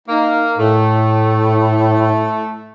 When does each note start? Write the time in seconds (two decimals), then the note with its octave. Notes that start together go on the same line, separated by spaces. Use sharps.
0.08 A#3 D#4
0.58 A2 A3